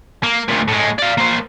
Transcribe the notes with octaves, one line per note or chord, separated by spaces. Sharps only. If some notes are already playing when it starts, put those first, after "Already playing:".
A#3
D2 A#2
A2 G#3
D5 F5
A#3 C5